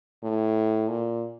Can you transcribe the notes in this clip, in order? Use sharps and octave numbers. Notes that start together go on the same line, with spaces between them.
A2
A#2